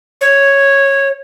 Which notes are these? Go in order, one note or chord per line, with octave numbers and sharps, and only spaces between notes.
C#5